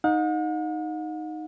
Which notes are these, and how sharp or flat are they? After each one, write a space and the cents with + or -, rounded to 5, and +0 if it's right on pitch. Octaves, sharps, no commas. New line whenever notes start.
D#4 +0 F#5 -45